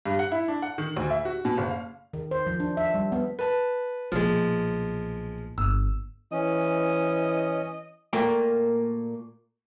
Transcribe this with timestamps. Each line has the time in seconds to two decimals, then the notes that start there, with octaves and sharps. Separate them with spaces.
0.06 G2
0.19 F#5
0.32 E4
0.48 D4
0.62 F#5
0.78 D#3
0.97 D2
1.11 E5
1.25 F#4
1.45 B2
1.57 F#1
1.71 F5
2.13 D#3
2.31 C5
2.47 F3
2.60 D4
2.77 E5
2.94 G3
3.12 B3
3.39 B4 A5
4.12 B1 A#2 F3 G#3
5.58 G1 E6
6.32 E3 C#4 D#5
8.13 A#2 A3 A#3 G5